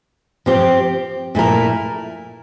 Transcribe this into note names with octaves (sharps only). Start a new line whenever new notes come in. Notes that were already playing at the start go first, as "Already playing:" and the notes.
F3 C4 G4
A#2 A3 E4 A#4